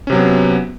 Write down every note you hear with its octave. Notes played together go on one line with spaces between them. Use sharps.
C3 F#3 B3 C#4